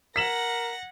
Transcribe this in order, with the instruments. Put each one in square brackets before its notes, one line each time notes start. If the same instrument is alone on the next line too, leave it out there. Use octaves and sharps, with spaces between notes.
[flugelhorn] A#4 [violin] F#5 A#6 [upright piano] B6 E7 F#7